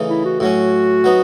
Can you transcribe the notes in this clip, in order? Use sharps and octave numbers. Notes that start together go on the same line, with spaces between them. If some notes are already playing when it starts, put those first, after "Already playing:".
Already playing: C#3 E3 A3 D#4
E4
F#4
A2 F#3 C#4 F#4
F#3 B3 D#4